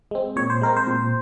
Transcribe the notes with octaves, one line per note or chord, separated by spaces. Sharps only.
G#3 C4
A#2 C#5
C5
G#3 C4 A#4
C5
A#2